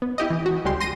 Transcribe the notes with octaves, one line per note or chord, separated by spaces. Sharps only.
B3
E4 G4 D#5
E3
F#4
C#2 G3 G#3 G4 C6
C6 A#6 D#7